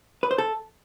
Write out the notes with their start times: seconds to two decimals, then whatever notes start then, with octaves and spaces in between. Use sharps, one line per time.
0.23 B4
0.31 C5
0.38 A4